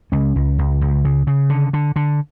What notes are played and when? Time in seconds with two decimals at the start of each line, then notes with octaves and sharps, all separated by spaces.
0.12 C#2 C#4
0.36 C#2
0.58 C#2
0.81 C#2
1.05 C#3
1.27 C#3
1.49 D3
1.73 D3
1.96 D3